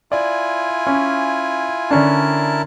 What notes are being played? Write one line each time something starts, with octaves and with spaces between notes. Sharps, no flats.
E4 F4 D5 G#5
C#4
D3 C#4 D4 E4 A#4 A5